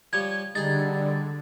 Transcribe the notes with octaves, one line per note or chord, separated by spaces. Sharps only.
F3 G3 C#5 G#6
D3 G3 D#4 G#4 A6